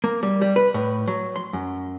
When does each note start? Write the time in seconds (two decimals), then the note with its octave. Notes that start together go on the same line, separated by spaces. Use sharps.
0.04 A#3
0.23 G3
0.42 G3
0.56 B4
0.74 A2
1.07 F#3
1.36 C6
1.53 F#2